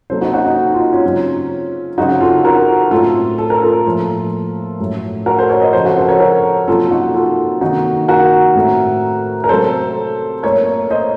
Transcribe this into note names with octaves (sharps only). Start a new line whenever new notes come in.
C3 F#3 A#3 A4 C5
D#4 F#4
D#4 F#4
D#4
F4
D#4
C#4 F4
C#3 F#3 C4
C#3 F#3 C4 D#4 F#4
F4 A4
F#4 A#4
A2 A3 C4 F4 A4
A4
A#4
F4 A4
A2 F3 A#3
A2 F#3 A3
F#4 A#4
A4 C5
A#4 C#5
C5 D#5
C#3 F3 C4 A4 C5
F#4 A#4
A4 C5
A#4 C#5
F#4 A#4
C3 F#3 A#3 C#4 F4 A4
D#4 F#4
F4 A4
C3 D#3 A#3 D#4 F#4
F#4 A#4
A2 A3 C4
A#4
C3 F#3 A3 A4 C5
A#2 A3 C4 A#4 C#5
C5 D#5